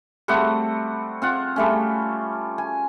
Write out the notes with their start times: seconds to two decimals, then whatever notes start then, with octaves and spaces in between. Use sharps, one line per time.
0.28 G3 A3 C4 F#5
1.22 C4 F4 F#5
1.56 G3 A3 C#4
2.58 G#5